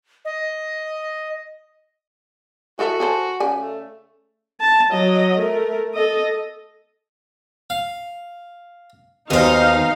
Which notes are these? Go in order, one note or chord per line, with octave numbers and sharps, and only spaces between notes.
D#5
E3 F#4 A4 E5
G#4 A4 C5
C#3 D5 G#5
A3
A5
F#3 D#5
A3 A#4
A4 D#5
F5
D#2 B2 D#4 G#4 C5 F5